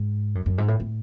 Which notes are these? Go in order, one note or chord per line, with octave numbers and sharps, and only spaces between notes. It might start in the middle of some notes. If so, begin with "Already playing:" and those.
Already playing: G#2
F#2
F#2
G#2
A2
A2